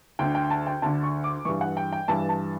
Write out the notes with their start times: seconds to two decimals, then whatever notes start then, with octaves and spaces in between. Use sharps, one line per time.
0.19 D2 D3 G5
0.35 G5
0.50 A5
0.67 G5
0.82 D2 D3 A5
1.03 C#6
1.24 D6
1.45 G2 E3 C#6
1.61 F#5
1.77 G5
1.92 G5
2.08 G2 E3 A5
2.29 A5